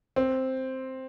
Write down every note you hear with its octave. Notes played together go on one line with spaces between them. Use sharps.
C4